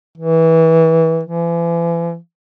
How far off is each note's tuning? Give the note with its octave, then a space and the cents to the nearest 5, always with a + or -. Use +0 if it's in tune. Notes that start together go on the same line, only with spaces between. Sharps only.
E3 -20
E3 +40